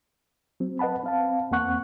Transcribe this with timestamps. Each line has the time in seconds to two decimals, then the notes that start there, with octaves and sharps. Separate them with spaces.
0.60 F#3 C4
0.79 B4 D#5 F#5 A5 B5
1.04 C4 F5 A5
1.51 E2 A#3 C4 F#5 C#6 F#6